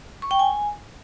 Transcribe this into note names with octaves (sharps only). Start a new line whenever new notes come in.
C#6
G5
G#5